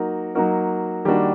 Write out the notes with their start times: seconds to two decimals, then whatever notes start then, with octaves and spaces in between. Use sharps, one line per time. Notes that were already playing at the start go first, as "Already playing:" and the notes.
Already playing: F#3 A#3 D#4 F#4 A#4
0.35 F#3 A#3 D#4 F#4 A#4
1.05 D#3 G3 A#3 D4 F#4